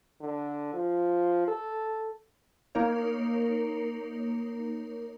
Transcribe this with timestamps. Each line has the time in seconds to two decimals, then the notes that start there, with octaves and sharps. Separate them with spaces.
0.21 D3
0.74 F3
1.48 A4
2.75 A#3 D#4 A#4 C#5